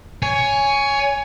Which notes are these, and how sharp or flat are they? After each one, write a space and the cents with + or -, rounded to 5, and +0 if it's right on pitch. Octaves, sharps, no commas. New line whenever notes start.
C#5 +15 G#5 +0